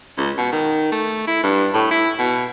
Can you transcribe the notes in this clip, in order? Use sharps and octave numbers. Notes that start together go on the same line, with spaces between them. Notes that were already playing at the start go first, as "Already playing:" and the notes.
C#2
B2
D#3
A3
E4
G2
A2
E4
B2